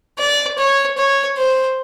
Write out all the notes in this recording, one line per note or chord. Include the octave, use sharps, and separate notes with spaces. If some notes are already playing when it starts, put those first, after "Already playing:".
D5
C#5
C#5
C5